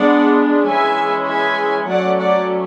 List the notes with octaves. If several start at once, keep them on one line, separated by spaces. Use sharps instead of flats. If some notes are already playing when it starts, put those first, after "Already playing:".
Already playing: G#3 B3 D4 D5 F#5
E3 G#3 C#4 E5 G#5
E5 G#5
F#3 A3 C#4 D5 F#5
D5 F#5